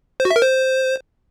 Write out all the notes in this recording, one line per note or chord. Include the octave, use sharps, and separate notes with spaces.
C5
F#4
E5
A#4
C5